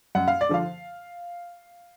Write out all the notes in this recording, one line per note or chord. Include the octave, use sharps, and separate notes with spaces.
F#2 F#5
F5
D5
D3 F3 F5